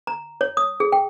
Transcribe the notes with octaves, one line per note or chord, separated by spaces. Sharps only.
A#5
C#5
D#6
G#4
G5